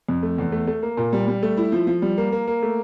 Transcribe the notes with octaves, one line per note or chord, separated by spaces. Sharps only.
F2
A3
E2
A3
A3
A#3
A#2
G3
G3
A3
E4
F3
F3
G3
A#3
A#3
A#3
A3